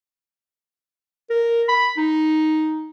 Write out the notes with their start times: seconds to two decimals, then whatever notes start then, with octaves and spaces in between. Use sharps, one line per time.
1.30 A#4
1.69 B5
1.97 D#4